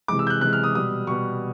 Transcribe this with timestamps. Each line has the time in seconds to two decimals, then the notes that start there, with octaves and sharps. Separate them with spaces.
0.08 C3 E3 G#3 D6
0.19 E6
0.27 G6
0.30 F#6
0.41 C3 E3 G#3 F#6
0.53 F6
0.64 D#6
0.75 B2 G3 D#6
1.07 B2 G3 C#6